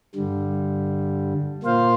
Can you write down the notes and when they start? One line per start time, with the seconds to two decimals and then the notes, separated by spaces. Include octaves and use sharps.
0.15 G2 D3 G3
1.63 A#2 A#3 F4 C5 F5